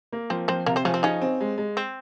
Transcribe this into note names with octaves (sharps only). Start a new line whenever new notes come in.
A#3
F3 C4 C5
F3 C4 C5
C3 A#3 A#4
C4 C5
C#3 F3 C#4
C4
C#3 C#4 D#4
C4
G#3
G#3
C4